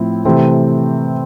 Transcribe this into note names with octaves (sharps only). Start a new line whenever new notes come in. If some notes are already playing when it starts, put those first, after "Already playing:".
Already playing: A2 F3 C4 E4
C3 E3 A3 C4